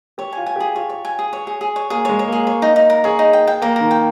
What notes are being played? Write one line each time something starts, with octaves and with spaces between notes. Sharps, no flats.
G4 C#5
F4 G#5
G#5
G4 G#4
F4 C#5
C#5
G#5
G#4
C#5
G#4
G#4
C#5
A#3 G#4
G#3 C#5
C#5
A#3 G#4
C#5
D#4
D#4
A#4
G#4 C#5
D#4
G5
G5
A#3 A#4
D#3 A#4
G5